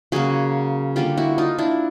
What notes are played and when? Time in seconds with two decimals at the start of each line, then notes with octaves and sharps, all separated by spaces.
0.12 C#3 F#3 A#3 F#4 G#4
0.96 D3 G3 A#3 F4 G4
1.17 E4 F#4
1.38 D#4 F4
1.58 D4 E4